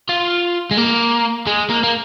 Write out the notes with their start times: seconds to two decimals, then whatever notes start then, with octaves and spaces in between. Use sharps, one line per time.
0.09 F4
0.71 G#3
0.77 A#3
1.47 G#3
1.70 A#3
1.83 A#3